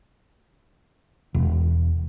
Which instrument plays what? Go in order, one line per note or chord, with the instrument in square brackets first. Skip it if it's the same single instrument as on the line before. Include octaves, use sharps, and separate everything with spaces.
[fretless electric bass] E1